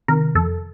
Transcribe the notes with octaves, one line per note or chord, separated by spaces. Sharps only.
C3 D#3 A#4
F2 A4